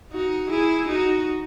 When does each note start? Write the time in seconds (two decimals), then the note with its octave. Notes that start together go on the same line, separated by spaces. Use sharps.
0.12 D#4 F#4
0.50 E4 G#4
0.88 D#4 F#4